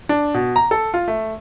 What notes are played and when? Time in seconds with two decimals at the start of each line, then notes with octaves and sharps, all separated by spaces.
0.09 D4
0.34 B2
0.56 A#5
0.71 A4
0.94 F4
1.08 A3